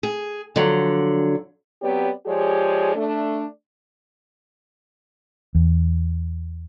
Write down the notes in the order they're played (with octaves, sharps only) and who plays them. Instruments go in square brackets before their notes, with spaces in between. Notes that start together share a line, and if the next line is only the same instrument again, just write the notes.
[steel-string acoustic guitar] G#4
D3 F3 F#3
[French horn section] F#3 B3 C4 G4 C#5 D5
F3 G#3 G4 G#4 C#5 D5
A3 D4
[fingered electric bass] E2